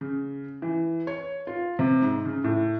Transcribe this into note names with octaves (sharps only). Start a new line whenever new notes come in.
C#3
E3
C#5
F4
C3
G#2
C#3
A2